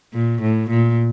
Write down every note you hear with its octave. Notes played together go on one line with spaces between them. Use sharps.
A#2
A2
A#2